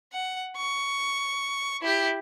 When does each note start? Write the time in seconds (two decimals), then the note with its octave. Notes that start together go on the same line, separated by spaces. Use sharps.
0.13 F#5
0.57 C#6
1.82 E4 G4